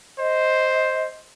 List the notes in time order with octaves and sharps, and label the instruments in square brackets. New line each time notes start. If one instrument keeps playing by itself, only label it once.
[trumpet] C5 [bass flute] D#5